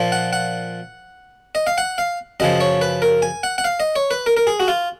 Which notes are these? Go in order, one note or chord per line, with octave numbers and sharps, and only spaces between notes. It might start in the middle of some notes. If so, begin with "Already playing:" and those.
Already playing: A#2 F3
F#5
F#5
D#5
F5
F#5
F5
F#2 C#3 F3 D#5
C#5
B4
A#4
G#5
F#5
F#5
F5
D#5
C#5
B4
A#4
A#4
G#4
F#4
F4